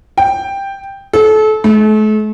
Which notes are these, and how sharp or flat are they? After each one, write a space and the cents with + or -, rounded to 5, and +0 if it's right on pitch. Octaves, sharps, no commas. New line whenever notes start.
G5 +5
A4 -30
A3 -40